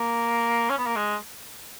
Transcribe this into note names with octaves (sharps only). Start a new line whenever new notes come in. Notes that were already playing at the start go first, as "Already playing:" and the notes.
Already playing: A#3
C#4
B3
A#3
G#3